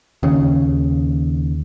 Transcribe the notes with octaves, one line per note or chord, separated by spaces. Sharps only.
D#2 C#3